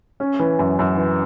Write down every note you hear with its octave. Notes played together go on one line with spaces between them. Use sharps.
C#4
E3
F#2
F#2
E3